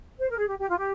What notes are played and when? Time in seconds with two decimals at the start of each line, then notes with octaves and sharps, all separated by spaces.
0.19 C5
0.29 A#4
0.38 G#4
0.48 G4
0.59 G4
0.69 F4
0.78 G4